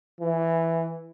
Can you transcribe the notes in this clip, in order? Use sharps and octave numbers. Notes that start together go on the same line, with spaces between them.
E3